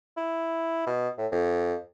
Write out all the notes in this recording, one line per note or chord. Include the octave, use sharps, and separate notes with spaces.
E4
B2
A2
F2